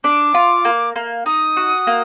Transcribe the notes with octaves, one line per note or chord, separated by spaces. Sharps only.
D4 D6
F4
A#3
A#3
D#4 D#6
F#4
A#3